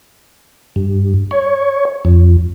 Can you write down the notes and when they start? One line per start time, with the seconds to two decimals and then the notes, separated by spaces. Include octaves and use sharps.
0.76 G2
1.31 C#5
2.05 F2